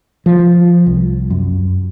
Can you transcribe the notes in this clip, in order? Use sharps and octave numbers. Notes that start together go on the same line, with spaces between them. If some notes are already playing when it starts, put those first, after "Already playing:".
F3
C2
F#2